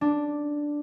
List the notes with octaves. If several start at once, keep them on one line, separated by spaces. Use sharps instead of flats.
D4